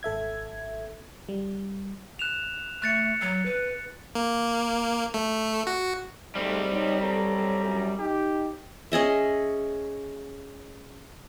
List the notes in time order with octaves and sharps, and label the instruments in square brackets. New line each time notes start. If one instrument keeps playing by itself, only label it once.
[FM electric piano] G#1 A4 E5 G#6
G3
[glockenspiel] F#6 E7 F7
[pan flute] A3 [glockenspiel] F#6 A6 C#7
[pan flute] F#3
B4
[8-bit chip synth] A#3
A3
F#4
[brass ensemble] G#2 A3 [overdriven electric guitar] G3 C4
[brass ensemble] B2 D#4 C#5
[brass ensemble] B1 A4 C#5 [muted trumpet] A#5
[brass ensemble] C2 F#2
[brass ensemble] D#4 [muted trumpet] G4
[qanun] C#4 G#4 D#5 E5